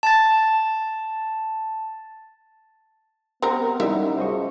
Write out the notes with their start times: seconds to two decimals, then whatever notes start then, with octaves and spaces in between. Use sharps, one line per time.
0.03 A5 A6
3.42 G3 B3 C4 A#4
3.80 F#2 G3 D#4 E4 E5
4.18 C#2 C5 D#5 C#6